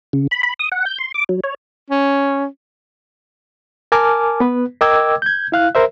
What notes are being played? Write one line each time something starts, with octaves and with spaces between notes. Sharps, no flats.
C#3
B5
B5
D#6
F#5
G6
C6
D6
F#3
C#5
C#4
A#4 G#5 A5 D6 F6
B3 B4
A#4 D#5 G5 D6 E6 G#6
G6 G#6
E4 F5 F#6
A#4 C5 E5